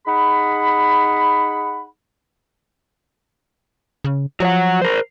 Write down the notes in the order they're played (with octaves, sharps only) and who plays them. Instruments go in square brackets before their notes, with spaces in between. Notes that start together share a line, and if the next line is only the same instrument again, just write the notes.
[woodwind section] D#4 G#4 F#5 B5
[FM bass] C#3
[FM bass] F3 [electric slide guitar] F#3 C#5 F#5
[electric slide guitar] A#4 C5